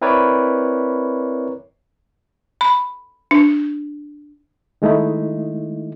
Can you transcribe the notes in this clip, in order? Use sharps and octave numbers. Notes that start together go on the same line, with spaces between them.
C4 E4 A#4 B4 C#5 D5
B5
D4
D#3 G#3 A3 D#4 E4